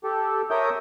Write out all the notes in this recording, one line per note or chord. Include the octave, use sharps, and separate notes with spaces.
G4 A4
A#4 C#5 E5 G5 D#6 G6